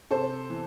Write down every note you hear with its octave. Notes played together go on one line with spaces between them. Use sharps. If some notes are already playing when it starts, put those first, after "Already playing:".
C3 A4 C5
E3